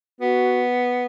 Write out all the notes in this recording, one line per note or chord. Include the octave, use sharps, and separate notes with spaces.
B3 F#4